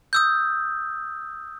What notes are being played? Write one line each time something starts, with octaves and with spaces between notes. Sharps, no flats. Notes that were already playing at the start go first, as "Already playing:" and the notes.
D#6 E6 G6